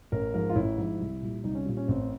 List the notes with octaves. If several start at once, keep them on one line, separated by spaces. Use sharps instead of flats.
A1 A#4
G#2 F3 A#4
F4
A1 E4
G#2 F3
C2
A#2 G3
C2 D#4
C#4
A#2 G3
C#4
A1 C4